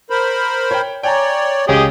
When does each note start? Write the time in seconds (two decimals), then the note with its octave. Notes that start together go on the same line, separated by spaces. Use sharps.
0.10 A#4 C5 B5
0.71 C#5 G5
1.03 C#5 D5 G5 G#5 A#5
1.69 C#2 G4 G#4 C#5 D#5